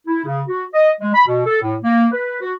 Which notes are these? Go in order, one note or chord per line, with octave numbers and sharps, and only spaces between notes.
E4
C#3
F#4
D#5
G#3
B5
B2
A4
A2
A#3
B4
F#4